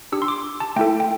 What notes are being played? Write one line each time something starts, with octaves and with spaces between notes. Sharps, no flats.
D4 G4 E6
C6
D6
A5
A3 E4 A4 G5
G5